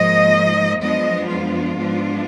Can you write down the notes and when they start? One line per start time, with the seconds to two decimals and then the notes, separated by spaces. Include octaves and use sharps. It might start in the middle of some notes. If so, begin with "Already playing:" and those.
Already playing: G#2 F3 A#3 D#5
0.81 F#2 F3 G#3 B3 D4 D#5
1.29 F4
1.76 G#2 F3 B3 D4